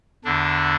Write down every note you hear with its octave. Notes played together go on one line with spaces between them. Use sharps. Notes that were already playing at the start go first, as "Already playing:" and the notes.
E2 D3 D4